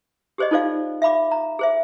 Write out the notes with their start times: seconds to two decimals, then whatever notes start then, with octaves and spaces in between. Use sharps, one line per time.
0.38 G4 G#4 C5 D5 D#5
0.51 D#4 F4 A4 C5 D5 F5
1.02 E5 F5 B5 D6
1.31 A#5
1.59 G#4 C5 E5